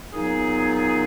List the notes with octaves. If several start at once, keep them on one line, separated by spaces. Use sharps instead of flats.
A#2 F#3 B3 D#4 G#4